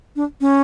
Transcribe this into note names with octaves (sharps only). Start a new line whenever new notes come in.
D4
C#4